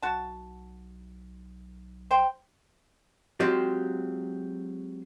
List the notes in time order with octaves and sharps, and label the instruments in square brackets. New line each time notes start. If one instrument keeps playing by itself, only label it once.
[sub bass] B1 [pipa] F#4 A5
[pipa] C5 G5
[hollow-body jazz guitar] F#3 G#3 C4 F4 G4